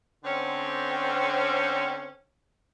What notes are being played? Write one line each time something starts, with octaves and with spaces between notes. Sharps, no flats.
D3 C4 C#4